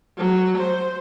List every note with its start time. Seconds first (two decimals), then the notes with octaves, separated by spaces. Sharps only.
0.18 F#3
0.58 C5